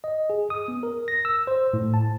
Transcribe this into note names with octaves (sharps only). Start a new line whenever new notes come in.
D#5
G#4
D#6
B3
A#4
A#6
E6
C5
A2
A5